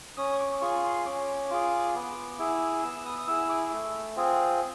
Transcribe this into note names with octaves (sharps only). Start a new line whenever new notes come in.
C#4 D#6
C#6
D6
F4 G#4 C#6
C6
C#4 D6
F4 G#4
B3
E4 G#4
B3 E6
D#6
D#6
E4 G#4 E6
D6
A3
C4 F4 G#4